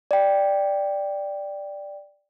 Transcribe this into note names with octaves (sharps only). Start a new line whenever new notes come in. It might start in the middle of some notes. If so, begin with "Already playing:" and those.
D5 G5